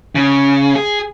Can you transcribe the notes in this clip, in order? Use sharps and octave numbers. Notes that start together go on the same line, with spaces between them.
C#3
G#4